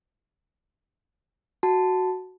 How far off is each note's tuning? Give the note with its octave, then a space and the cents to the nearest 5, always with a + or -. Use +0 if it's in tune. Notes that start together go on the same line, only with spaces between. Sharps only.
F#4 +0 A5 +0